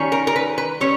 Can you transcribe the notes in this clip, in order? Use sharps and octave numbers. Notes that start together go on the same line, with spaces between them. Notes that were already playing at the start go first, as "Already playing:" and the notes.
Already playing: D#3 G3 C#4
A#4
A#4
B4
B4
G3 C#4 C#5